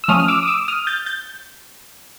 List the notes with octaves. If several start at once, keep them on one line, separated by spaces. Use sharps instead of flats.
E6
F3 A3 C#4 D#6 F6
F6
D6 E6
D#6
D6 E6
D#6 F6
G6 A6
G6 A6